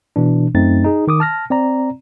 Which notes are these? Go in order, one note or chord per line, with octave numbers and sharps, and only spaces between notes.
B2 E3 D4
F#2 A3 C4 D#4 A6
D#4 G#4
D#3 D6 D#6
A5 F6 A#6
C4 D5 A#5